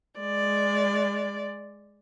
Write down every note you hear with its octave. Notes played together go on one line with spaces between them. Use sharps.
G#3 D5